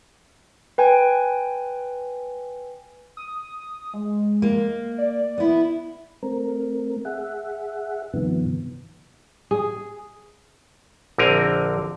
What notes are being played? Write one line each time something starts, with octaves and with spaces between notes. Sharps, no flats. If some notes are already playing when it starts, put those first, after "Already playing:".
B4 G5 G#5
D#6
G#3
A#3
D5
B3 E4
A3 C4 A#4
G#4 E5 F#5
G2 C3 D#3 F3 B3
G#4
A#1 D3 C4 A#4 G#5